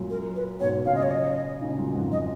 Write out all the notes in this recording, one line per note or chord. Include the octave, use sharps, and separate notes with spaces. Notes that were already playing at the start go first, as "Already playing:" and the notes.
Already playing: F#2 A#2
A#4
B4
G#2 B2 C#5
A#2 C#3 F5
D#5
C#5
D#5
A#2 C#3
F#2 A#2
F2 G#2
D#5